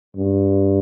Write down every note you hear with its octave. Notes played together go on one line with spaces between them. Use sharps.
G2